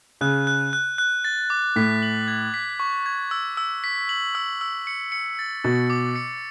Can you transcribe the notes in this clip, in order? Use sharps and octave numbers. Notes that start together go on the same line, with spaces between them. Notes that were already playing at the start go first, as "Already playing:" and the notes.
C#3 F#6
F#6
F#6
F#6
A6
D6
A2 B6
F#7
G#6
B6
C#6
G#6
E6
E6
B6
F#7
E6
E6
C#7
C#7
A6
B2 A6
D6
C#7